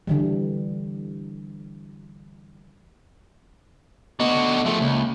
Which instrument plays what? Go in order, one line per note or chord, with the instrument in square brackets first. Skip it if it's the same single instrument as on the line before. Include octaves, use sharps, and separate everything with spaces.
[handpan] D3 E3 G3
[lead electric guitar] D3 F#4 [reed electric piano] B3 D#5
[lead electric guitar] F3 A3 [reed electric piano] G#4 E5
[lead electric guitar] C#2 [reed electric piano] A#3